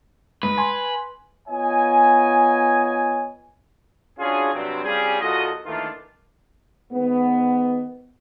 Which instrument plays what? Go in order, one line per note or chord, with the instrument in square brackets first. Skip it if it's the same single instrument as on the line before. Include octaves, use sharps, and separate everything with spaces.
[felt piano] G#2 [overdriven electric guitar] B4
[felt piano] G#5 C6
[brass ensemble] B3 F4 C#5 D#5 G#5
C#4 D4 F4 F#4 G#4
G2 C3 F#3 G3 C4
G3 C4 C#4 F4 G4 G#4
C2 F4 F#4 A4 D#5
D#3 E3 A3 A#3 D4 F4
[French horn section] G#2 D#3 B3